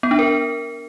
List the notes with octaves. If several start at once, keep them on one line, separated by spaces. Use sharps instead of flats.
B3
D4
A#4